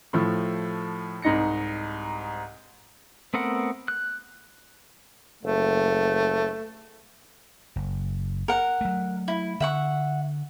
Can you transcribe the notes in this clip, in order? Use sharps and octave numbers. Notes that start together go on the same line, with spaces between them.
A2 F3 A3
C2 G#2 D#4 A#6 C#7
A3 B3 C4 A#4 F#5
F#6
F#1 A3
F#1
A#4 F#5
F#3 A3
E4
D3 E5 F#5 C#6